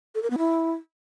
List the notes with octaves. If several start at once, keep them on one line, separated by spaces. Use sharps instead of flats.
A4
A#4
B3
E4